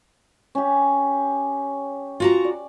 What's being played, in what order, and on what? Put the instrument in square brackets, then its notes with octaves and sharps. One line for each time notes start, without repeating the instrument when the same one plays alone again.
[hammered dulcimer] C#4 G4
[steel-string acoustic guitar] F4 F#4 A#5
[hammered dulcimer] D5